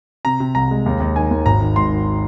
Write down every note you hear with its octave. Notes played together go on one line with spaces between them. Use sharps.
C3 A#5
C3
C2 A#5
G#3
D#2
D#2
D#3 G#5
D#2
G#1 A#5
D#3
G#2 C6
D#3